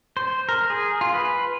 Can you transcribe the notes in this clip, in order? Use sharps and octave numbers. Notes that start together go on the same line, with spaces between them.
C5
A#4
G#4
F4
B4